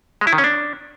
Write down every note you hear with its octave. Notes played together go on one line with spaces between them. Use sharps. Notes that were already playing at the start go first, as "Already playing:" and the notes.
G#3
E4
D#3
C#4
D4